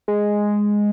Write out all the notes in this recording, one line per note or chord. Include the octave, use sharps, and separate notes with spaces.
G#3